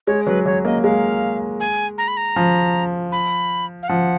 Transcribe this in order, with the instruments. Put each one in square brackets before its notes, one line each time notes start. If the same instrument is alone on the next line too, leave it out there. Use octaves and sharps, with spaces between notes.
[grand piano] G#3 [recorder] C#5
[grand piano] F#3 [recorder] B4
[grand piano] F#3 [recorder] C#5
[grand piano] A#3 [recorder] D#5
[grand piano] G#3 [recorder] F5
[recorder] G#5
A#5
B5
A#5
[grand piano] F3
[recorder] B5
F5
[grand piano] F3 [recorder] F#5